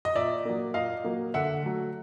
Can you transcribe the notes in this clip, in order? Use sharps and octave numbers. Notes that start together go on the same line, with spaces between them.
D#5
A#2 D5 E5
F#3 A#3
A#2 D#5 F5
F#3 A#3
D3 E5 F#5
F#3 A3